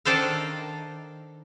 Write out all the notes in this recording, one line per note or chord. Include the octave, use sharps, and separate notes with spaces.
D#3 D4 A4 C5 F5